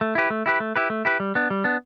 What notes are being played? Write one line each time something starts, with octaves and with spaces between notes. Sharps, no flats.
A3
E4 G4 B4
A3
E4 G4 B4
A3
E4 G4 B4
A3
E4 G4 B4
G3
B3 D4
G3
B3 D4